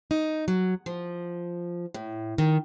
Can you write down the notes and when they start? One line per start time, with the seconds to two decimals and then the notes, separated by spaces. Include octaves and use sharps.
0.11 D#4
0.48 F#3
0.86 F3
1.94 A2
2.38 D#3